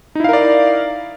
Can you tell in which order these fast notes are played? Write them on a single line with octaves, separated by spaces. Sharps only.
D#4 E4 F5 A#4 D5